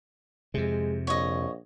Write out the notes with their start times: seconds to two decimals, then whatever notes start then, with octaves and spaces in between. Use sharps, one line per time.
0.54 F2 C3 G#3
1.07 A#1 C#5 D#5